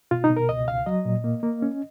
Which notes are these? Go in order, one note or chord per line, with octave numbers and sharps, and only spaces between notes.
B2 F4
D#4
B2
A#4
C#2 D#5
C#2 F5
F#3 D#5
A#2
A#3
A#3
C#4